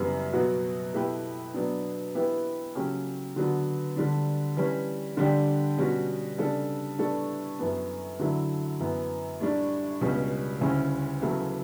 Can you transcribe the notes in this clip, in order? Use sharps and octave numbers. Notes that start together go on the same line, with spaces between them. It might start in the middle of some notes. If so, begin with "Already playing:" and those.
Already playing: F#2 C#3 E3 G3 B3
B2 F#3 B3 F#4
B2 A3 E4 G4 B4
B2 F#3 B3 D4
E3 B3 E4 G4 B4
C#3 F#3 A3 C#4 G4
D3 F#3 B3 F#4 B4
D3 G3 D4
E3 G3 C#4
D3 G3 D4 G4
B2 G3 C#4 F#4
C#3 G3 D4 A4
A2 G3 B3 D4 A4
F#2 E3 B3
D3 F#3 A3 E4
F#2 E3 B3
A2 G3 D4
C#2 B2 G3 C#4
D2 C#3 G3 C#4 E4
E2 C#3 F#3 A3 E4